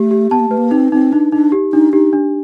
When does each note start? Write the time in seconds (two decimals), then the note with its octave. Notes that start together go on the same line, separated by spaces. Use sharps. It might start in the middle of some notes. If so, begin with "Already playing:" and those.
Already playing: A3 G4
0.11 G4
0.31 B3 A5
0.40 A#3
0.48 A3 B4
0.57 A#3
0.71 C4 D#4
0.92 C4 D#4
1.12 D4 D#4
1.32 D4 D#4
1.52 G4
1.73 D4 D#4
1.93 D#4 G4
2.13 D4